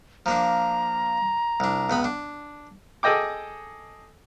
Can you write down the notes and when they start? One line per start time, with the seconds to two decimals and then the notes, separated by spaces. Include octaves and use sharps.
0.26 F3 A#3 D4 A#5
1.60 C2 D4
1.90 C#2 B3 B5
2.04 D4
3.03 G#4 A4 D#5 G5 D6